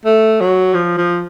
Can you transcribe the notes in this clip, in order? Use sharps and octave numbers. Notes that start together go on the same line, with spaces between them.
A3
F#3
F3
F3